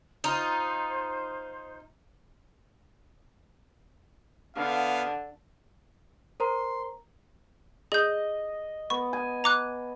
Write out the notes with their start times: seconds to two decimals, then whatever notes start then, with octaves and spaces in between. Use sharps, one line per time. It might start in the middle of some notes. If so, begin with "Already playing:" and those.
0.24 D#4 F4 C5
4.56 D3 B3 F5
6.40 A#4 C5 A#5 C6
7.92 G#4 D#5 G6
8.90 B3 C#6
9.13 G#5
9.44 A#5 D6 F#6